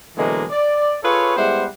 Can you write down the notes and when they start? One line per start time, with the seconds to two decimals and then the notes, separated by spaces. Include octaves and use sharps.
0.16 B2 D3 E3 F#3 G#3 A#3
0.50 D5
1.04 F4 G#4 A4 B4 C#5
1.37 G3 G#3 B3 E4 C5 F#5